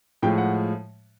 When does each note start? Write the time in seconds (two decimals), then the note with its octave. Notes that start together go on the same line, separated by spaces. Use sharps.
0.22 A2 F3 G#3 G5
0.38 F#5